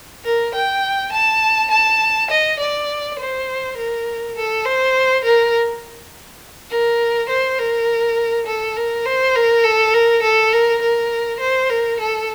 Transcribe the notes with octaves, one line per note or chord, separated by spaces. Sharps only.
A#4
G5
A5
A5
D#5
D5
C5
A#4
A4
C5
A#4
A#4
C5
A#4
A4
A#4
C5
A#4
A4
A#4
A4
A#4
A#4
C5
A#4
A4